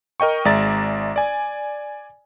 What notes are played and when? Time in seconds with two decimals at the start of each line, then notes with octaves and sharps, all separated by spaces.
0.20 A#4 D#5 G5 C#6
0.45 G#1 G#3 D5 E5 A#5 A6
1.16 D5 G#5